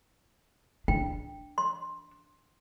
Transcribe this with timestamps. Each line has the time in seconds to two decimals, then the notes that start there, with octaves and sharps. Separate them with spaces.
0.88 D4 G5
1.58 C6